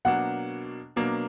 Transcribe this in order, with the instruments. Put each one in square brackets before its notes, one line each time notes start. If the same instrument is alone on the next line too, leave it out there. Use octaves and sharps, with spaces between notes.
[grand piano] B2 F#3 A#3 D4 [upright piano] F#5
[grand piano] B2 F#3 A#3 D4